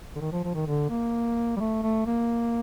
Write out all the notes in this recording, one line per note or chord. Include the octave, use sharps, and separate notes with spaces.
D3
D#3
F3
F3
D#3
D3
A#3
G3
A3
A3
A#3